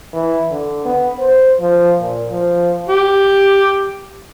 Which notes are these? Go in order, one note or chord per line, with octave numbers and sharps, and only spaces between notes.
E3
D3
B3
C5
F3
A#2
F3
G4